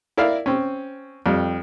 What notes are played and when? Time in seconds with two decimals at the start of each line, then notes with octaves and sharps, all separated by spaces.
0.17 E4 A#4 D5 E5 F5
0.46 C4 C#4
1.26 F2 G3